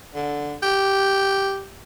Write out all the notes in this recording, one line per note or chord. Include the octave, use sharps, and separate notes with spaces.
D3
G4